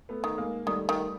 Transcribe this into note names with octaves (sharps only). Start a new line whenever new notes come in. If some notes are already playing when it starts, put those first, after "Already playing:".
A3 B3
D#3
G#3 A#3
D#3 G3 A3
D#3